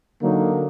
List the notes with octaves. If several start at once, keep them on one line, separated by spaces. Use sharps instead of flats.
D3 F#3 A#3 D#4